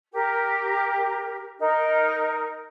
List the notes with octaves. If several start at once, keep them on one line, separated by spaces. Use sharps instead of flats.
G4 A#4
D#4 A#4